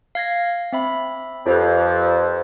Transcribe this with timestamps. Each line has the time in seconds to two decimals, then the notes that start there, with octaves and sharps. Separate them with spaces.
0.15 F5 G#6 A#6
0.72 C4 E5 B5
1.47 F2 F4 G4 B4